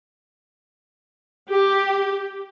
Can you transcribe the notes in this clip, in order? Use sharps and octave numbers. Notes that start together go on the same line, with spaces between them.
G4